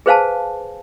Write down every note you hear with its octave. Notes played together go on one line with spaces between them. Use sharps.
G#4 B4 C5 F5 G#5 A5